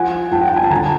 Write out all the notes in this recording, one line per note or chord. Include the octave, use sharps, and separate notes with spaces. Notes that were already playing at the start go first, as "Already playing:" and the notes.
Already playing: F3 F#5 G#5
F3 G5 A5
F#5
G5
G#5
A5
D3 G#5 A#5